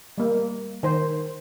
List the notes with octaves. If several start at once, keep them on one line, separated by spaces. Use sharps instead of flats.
G3 A#3
D#3 C5